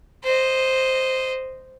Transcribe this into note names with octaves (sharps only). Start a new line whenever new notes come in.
C5 D#5